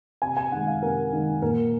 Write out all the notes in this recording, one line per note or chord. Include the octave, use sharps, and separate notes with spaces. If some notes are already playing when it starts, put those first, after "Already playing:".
C3 G#5
G#5
D#3 G#3 F#5
F5
C3 A#4
D#3 G#3
A#2 A#4